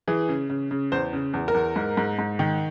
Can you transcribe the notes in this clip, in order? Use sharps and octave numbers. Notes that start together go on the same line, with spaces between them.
E3 G#4
C#3
C#3
C#3
E2 C5
C#3
E2
A#4
E2
G#2
G#2
G#2
D#3